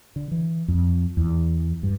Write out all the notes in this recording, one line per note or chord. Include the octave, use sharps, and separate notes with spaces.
D3
E3
F2
E2
G2